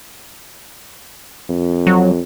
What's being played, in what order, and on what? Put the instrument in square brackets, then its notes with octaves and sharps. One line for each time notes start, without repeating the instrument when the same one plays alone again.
[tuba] F2
[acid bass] F#3